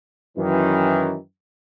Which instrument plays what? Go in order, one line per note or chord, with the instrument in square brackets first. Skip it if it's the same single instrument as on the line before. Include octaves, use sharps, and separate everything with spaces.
[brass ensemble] F#2 D#3 E3